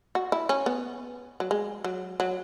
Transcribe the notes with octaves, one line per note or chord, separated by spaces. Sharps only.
F#4
E4
C#4
B3
F#3
G#3
F#3
F#3